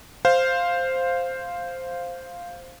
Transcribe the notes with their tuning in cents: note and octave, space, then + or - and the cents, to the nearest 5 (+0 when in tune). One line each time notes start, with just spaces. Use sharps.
C5 +0 F5 +0